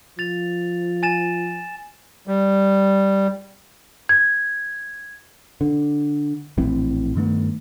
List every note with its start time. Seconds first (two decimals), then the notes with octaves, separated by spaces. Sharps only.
0.19 F3 A6 F7
1.03 G#5 A6 E7
2.27 G3
4.09 G#6
5.61 D3
6.57 A#1 A2 E3 C4
7.15 G2 D#3 A3 B3